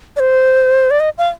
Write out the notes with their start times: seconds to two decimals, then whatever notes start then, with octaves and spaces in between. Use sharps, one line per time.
0.16 D5
0.20 C5
0.90 D5
1.00 D#5
1.18 F5